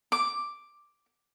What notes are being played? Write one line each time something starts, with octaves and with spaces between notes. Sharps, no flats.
D6